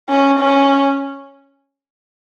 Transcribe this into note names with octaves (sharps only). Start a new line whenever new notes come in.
C#4
C#4